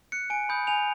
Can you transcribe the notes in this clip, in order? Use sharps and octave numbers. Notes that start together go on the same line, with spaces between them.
F#6 C#7
G#5 D7
B5 D#6 G6
G#5 F7